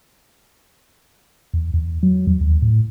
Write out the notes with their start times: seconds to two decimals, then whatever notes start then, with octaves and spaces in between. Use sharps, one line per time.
1.54 E2
1.74 E2
2.03 F#3
2.27 E2
2.41 D#2
2.62 A2